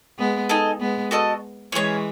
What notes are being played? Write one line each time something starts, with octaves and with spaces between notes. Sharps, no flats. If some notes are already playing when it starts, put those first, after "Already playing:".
G#3 B3
D#4 A4 D#5 G#5
G#3 B3
F#4 A4 D#5
E3 G#3 C#4 G#4 C#5